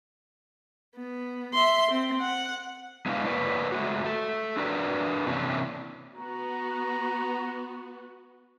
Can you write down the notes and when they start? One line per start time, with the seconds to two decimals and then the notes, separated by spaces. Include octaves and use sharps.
0.96 B3
1.54 E5 C6
1.91 C4
2.21 F#5
3.06 G#3 B3 D4 E4 F5
3.26 A#3 A#4 B4 C#5 D5
3.72 G#3 A3 F#4
4.04 A3 A4
4.57 D4 F#4 A#4 B4 D5
5.27 C3 E3 A#3 C#4 D4
6.17 B3 F#4 A#5